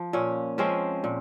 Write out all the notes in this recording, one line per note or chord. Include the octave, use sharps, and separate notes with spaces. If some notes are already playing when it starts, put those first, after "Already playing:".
Already playing: F3
A#2 C#4
F3 G#3 C4 C#4
A#2